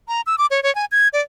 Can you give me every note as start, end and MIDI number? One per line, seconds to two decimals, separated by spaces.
0.08 0.21 82
0.27 0.36 88
0.38 0.46 86
0.51 0.63 73
0.63 0.73 73
0.75 0.85 80
0.92 1.08 92
1.13 1.21 74